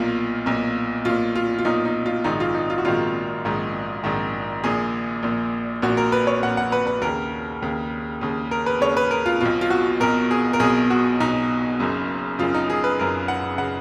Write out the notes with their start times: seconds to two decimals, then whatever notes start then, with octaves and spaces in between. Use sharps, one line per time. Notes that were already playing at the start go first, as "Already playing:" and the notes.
Already playing: B1 A#2 F4
0.46 B1 A#2
1.05 B1 A#2 F4
1.36 F4
1.59 F4
1.65 B1 A#2 D#4
1.85 D#4
2.06 F4
2.24 A#1 G#2 D#3 D#4
2.40 F4
2.54 D#4
2.70 F4
2.78 F#4
2.85 A#1 G#2 D#3 F4
3.45 A#1 G#2 D#3
4.04 A#1 G#2 D#3
4.64 A#1 A#2 G#4
5.23 A#1 A#2
5.82 A#1 A#2 F#4
5.97 A#4
6.12 B4
6.27 C#5
6.43 A#1 A#2 F#5
6.57 F#5
6.72 B4
6.87 B4
7.02 D#2 A#4
7.07 C#3
7.62 D#2 C#3
8.21 D#2 C#3
8.51 A#4
8.66 B4
8.81 D#2 C#3 C#5
8.97 B4
9.11 A#4
9.26 F4
9.41 B1 B2 F4
9.61 F4
9.70 F#4
10.00 B1 B2 A#4
10.31 G#4
10.53 A#4
10.60 B1 B2 G#4
10.90 F#4
11.20 B1 B2 D#4
11.79 F#1 F#2 C#3
12.39 F#1 F#2 C#3 F4
12.54 D#4
12.70 G#4
12.84 B4
12.99 F#1 F#2 C#3 A#4
13.28 F#5
13.58 C#3 F#5